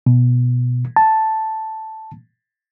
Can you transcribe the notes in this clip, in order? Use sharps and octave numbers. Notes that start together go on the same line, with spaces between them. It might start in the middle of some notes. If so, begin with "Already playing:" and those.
B2
A5